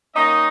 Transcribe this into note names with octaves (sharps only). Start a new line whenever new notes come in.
D#3 A#3 C#4 D#4 D#5